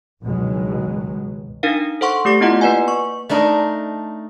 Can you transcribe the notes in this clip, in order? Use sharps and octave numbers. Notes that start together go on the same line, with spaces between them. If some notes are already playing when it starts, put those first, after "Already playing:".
C#2 G2 B2 D#3 F#3 G#3
D4 D#4 A#4 F5
A4 C5 F#5 C6 C#6
A3 G4 D6 A#6
B3 E4 F4 D#5 F#5
A#3 B4 D5 F#5 G#5
C#6
A3 D4 D#4 A#4